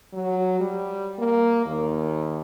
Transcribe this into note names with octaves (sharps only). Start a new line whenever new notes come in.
F#3
G3
A#3
D#2